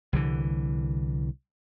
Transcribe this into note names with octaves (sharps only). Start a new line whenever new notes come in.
C2 D3 E3